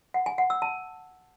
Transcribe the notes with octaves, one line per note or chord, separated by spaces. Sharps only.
F#5
G#5
F#5
E6
A5